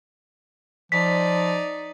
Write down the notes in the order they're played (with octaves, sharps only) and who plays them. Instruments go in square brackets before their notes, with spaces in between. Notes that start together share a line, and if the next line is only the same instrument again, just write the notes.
[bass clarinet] F3 [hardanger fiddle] D#4 D5 [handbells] B6